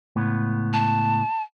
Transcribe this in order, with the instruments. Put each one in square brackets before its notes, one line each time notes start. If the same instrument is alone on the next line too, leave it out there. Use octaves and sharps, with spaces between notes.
[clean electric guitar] C#2 A2 B3
[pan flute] A5